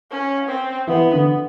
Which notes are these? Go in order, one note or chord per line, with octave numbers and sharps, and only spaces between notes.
C#4
C4
E3 B3
D3